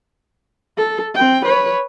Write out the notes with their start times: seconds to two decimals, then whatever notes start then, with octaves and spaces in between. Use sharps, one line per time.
0.78 A4
1.14 C4 G5
1.46 B4 C#5